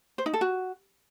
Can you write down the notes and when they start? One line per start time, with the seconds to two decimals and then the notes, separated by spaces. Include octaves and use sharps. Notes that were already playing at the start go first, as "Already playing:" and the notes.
0.18 C5
0.26 D#4
0.33 A4
0.41 F#4